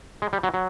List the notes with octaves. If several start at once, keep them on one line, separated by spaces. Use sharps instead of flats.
G#3
G3
F#3
F#3